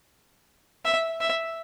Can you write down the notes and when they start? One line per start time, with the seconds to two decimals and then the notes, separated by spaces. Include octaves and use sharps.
0.85 E5
1.21 E5